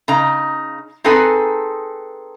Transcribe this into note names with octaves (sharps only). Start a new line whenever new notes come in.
C#3 D#4 A#5
C4 D#4 G#4 A4 B4 G#5